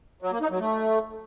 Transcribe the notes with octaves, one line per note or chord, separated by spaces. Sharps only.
F#3
A#3
D#4
F#3
A3